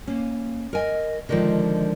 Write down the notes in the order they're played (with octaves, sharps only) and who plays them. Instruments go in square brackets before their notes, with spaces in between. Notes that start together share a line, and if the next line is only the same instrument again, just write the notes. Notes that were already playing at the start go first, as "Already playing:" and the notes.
[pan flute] A#3 [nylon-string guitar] C#4
[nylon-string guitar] A#4 G#5 [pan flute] D#5
[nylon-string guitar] D3 D#3 F3 [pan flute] G#3